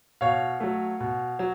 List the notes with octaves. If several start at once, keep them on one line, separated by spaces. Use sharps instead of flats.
B2 C#5 F5
F#3 A3
B2
F#3